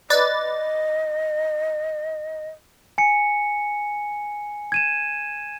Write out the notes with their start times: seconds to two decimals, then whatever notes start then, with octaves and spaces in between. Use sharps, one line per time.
0.10 B4 D5 D#5 A6
2.98 G#5 C#7
4.72 G#6 D#7 E7